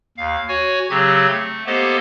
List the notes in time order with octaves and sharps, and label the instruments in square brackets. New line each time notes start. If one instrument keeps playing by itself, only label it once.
[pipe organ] D#2 F5
F#4 C#5 G#5
C#3 F#3 C4 G4 G#6
A3
A#3 B3 G4 A4 C5 D#5